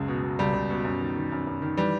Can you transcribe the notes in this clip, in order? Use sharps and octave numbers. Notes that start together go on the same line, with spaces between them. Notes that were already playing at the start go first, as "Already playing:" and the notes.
Already playing: C#2 F#2 G#3
B2
B2
C#2 G3
C#2
B2
F#2
D#3
D#3
F#2
F#2
D#3
E3 G3